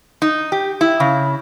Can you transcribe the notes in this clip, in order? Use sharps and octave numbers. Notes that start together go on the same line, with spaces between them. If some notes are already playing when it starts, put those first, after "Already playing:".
D#4
G4
E4
C#3